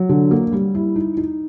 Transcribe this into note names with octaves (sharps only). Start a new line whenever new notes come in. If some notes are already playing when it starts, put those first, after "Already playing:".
Already playing: F#3
D3
A#3
G3
E4
D#4
D#4